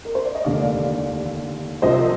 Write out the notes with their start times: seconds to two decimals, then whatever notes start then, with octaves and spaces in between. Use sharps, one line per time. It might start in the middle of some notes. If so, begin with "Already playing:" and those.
0.05 A#4
0.15 C5
0.25 D5
0.35 D#5
0.44 F1 D#2 D3 D5 F5
1.82 C2 C3 F3 C5 D#5